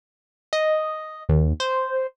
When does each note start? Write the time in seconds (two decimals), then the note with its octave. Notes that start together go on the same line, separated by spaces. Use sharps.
0.53 D#5
1.29 D#2
1.60 C5